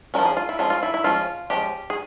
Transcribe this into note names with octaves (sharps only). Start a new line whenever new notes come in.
F3 G#3 C#4 A#4
G#4
F4
E4
F3 G#3 C#4 F4
F4
E4
E4
F3 G#3 C#4 F4
F3 G#3 C#4 G4
G#4